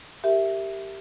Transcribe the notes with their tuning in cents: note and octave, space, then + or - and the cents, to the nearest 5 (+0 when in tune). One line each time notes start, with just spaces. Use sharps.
G4 +0 A#4 -20 E5 +0